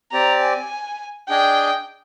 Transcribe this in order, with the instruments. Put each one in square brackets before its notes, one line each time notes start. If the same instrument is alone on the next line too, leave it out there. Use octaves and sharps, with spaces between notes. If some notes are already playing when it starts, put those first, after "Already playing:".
[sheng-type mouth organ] C4 G4 D5 [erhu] A#5
[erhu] G#5
[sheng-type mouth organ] D4 G#4 D#5 G#5 [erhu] G5